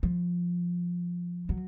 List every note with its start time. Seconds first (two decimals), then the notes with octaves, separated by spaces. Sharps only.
0.03 F3
1.49 F#3